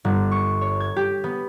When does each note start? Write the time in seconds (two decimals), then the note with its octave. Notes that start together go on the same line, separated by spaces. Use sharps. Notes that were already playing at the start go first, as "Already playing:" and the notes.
0.05 G1
0.32 C#6
0.61 C#5
0.80 G#6
0.96 G4
1.24 B3